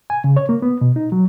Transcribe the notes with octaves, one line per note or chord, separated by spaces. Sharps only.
G#5
C#3
C#5
A#3
B3
B2
D#4
F#3